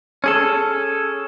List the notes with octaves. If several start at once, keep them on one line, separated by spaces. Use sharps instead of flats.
C#4 G#4 A4